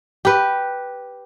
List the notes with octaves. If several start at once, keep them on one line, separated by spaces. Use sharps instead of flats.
G4 B4